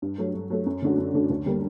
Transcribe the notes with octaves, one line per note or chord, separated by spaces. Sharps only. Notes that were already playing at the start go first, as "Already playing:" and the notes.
G2
F#3 A3
G2
F#3 A3
F#2
D3 A3 D4 F#4
F#2
D3 A3 D4 F#4
D2
D3 G3 A#3 D4